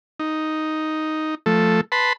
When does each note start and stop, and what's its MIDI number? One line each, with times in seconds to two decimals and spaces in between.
0.20 1.35 63
1.46 1.81 53
1.46 1.81 57
1.46 1.81 69
1.92 2.13 71
1.92 2.13 81
1.92 2.13 83
1.92 2.13 84